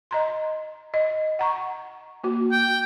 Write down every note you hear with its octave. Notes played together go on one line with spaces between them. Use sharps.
D#5 A#5 C6
D#5
F#5 A#5 C#6
A#3 F#4
G5